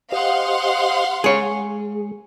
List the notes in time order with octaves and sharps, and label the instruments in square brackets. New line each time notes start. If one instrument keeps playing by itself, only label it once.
[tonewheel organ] G4 C5 D#5 [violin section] F5 F#5 C6
[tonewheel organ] G#3 [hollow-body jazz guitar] G#4 C#5